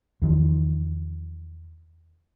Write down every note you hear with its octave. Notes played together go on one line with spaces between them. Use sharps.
E2 D#3 F3